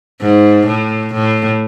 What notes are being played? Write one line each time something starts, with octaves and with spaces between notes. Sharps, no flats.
G#2
A2
A2